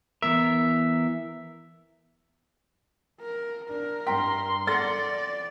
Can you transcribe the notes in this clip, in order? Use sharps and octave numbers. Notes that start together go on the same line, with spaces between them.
E3 B3 A#4 E5
A#4
D4 A#4
G2 G5 A#5 C6 B6
A4 D5 F#5 A6 A#6